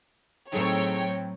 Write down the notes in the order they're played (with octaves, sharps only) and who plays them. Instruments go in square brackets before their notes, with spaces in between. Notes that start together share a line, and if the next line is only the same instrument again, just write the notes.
[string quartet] A2 C4 [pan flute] F#3 [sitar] D#4 G#4 A4 [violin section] C#5 G5